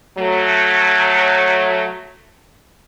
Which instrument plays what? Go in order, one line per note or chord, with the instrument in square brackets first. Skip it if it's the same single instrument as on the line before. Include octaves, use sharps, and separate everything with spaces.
[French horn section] F#3 A3